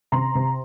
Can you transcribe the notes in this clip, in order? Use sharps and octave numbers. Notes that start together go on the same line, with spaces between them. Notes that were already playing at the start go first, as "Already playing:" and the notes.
C3 A#5 C6
C3